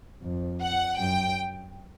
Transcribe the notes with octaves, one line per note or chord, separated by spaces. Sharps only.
F2
F#5
F#2 G5